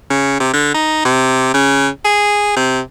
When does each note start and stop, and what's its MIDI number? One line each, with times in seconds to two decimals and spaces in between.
0.10 0.37 49
0.40 0.49 48
0.53 0.70 50
0.74 1.00 63
1.05 1.53 48
1.54 1.88 49
2.05 2.53 68
2.56 2.80 48